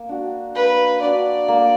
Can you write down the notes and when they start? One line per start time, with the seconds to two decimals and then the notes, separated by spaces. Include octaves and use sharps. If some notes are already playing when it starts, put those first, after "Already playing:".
Already playing: A#3
0.09 D4 F#4
0.55 A#3 B4
1.01 D4 F#4 D5
1.48 A#3